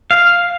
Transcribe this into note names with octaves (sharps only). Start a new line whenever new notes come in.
F5